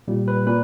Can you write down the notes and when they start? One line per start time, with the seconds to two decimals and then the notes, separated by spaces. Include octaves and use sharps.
0.08 A#2 G3
0.28 B4
0.46 A#2 B4